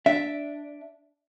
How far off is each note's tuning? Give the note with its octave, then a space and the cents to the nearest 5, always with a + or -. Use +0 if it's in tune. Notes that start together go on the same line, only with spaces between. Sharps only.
D4 -5 E5 +0